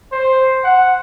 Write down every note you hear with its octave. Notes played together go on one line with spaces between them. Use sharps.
C5
F#5